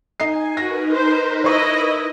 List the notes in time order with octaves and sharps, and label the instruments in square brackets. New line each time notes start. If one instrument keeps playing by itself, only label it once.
[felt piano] D#4 D#5 C7 [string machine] G#5
[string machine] D#4 A#4 B4 [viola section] F#4 [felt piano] A#6
[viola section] C5
[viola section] E4 D#5 [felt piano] C5 C#6